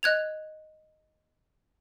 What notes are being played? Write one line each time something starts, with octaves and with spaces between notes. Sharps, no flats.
D#5 F#6 G#6 F7